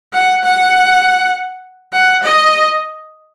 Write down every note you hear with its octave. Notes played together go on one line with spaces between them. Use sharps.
F#5
F#5
F#5
D#5